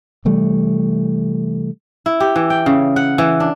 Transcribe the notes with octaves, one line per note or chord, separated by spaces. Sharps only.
C3 E3 G3 A3
E4
G4
E3
G5
C#3
F#5
E3
D4